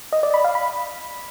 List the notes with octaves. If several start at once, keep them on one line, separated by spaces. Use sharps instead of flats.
D#5
D5
B5
F5
B5